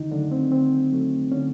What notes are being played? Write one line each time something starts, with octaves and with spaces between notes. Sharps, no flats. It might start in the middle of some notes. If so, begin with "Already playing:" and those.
Already playing: D3 D#3 D#4
D3 F#3 A3 D4
C4
D3 C4
F#3 A3
D3 C#4